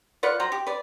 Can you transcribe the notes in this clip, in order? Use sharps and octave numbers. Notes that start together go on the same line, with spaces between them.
F4 B4 D5 F#5
F#3 C5 A#5
G4
B4 D5